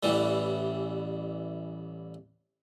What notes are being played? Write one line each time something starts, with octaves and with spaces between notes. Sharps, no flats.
A1 E3 G3